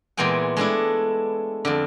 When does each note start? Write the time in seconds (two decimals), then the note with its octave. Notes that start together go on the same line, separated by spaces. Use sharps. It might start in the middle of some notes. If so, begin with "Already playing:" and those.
0.17 A#2 E3 G#3 B3 G5 G#5
0.57 G#3 A3 D4 E4
1.65 F2 D3